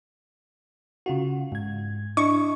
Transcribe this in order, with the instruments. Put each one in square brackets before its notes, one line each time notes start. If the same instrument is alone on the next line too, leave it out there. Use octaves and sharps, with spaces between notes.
[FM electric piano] C#3 F4 F#4
G#2 G#6
[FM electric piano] D4 E4 D#5 [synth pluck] C#6